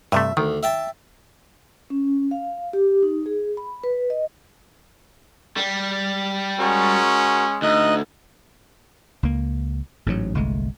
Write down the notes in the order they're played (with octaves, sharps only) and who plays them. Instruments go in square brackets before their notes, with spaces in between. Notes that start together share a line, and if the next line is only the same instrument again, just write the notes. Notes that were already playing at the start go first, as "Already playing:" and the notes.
[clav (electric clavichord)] G2 C3 A3 [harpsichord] E5
[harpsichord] D2 [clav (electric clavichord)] D#3
[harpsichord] E5 G5 A5
[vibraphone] C#4
F5
G4
D#4
G#4
B5
B4
D#5
[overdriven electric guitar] G3
[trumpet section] G#3 C#4 [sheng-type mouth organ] F#4 A#4
[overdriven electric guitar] D2 [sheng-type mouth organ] D#4 D#5 F#6
[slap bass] C#2 A#3
A1 G#2 D#3 F#3
G1 C2 G#3 A3